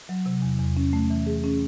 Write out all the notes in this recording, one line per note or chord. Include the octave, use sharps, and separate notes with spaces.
F#3
C3
E2
E2
C#4
A3
E3
G#4
C#4